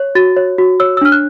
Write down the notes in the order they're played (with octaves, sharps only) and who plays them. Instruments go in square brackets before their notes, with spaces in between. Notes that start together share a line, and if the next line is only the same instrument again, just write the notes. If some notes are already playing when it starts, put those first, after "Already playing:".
Already playing: [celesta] C#5
F#4 A6
C#5
F#4
C#5 E6
E6
D4 F6
F#6